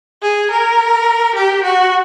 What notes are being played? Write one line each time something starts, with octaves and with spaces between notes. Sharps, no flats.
G#4
A#4
G4
F#4